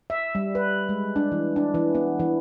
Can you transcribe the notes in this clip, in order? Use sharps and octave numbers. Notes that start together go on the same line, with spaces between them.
E5
G3
B4
G#3
D4
E3
D4
E3
B3
E3